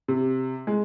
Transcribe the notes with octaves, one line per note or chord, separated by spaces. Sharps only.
C3
G#3